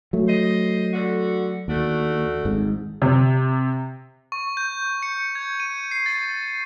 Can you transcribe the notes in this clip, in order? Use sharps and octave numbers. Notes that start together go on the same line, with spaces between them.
F#3 A3
C5 D#5
D3 F#4
D#2 A3 D4 F#4
G#1 G#2
C3
C#6
G6
C#7
G#6
D#7
C7
A6